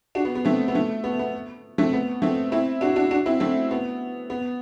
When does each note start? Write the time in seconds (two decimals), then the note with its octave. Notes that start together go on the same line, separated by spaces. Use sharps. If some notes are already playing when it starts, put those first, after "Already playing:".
0.15 D4 F#4
0.25 B3
0.35 B3
0.45 A3 C4
0.68 B3
0.75 A3
1.04 B3
1.19 B3
1.78 A3 C4
1.93 B3
2.22 A3 C4
2.52 C4 E4
2.81 D4 F#4
2.96 D4 F#4
3.11 D4 F#4
3.26 C4 E4
3.40 A3 C4
3.71 B3
4.30 B3